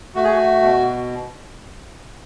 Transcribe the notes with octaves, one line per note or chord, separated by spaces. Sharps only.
A3 F#4
G#4
F#4
B2